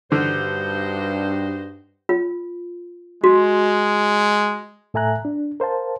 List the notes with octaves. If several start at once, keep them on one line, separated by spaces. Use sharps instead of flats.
G2 D3 D#4 F#4 C5
F4
G#3 F#4
A2 A4 E5 G#5 A#5 F#6
D4
A#4 C5 F5 A5